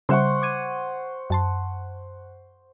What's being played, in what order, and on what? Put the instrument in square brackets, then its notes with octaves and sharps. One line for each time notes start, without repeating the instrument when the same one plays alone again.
[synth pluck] C#3 G3 E5 [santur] C5 F#5 C#6
[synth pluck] D6 G#6 D#7
F#2 A5 C6